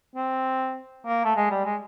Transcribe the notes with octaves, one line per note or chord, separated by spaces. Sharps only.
C4
A#3
A3
G#3
G3
G#3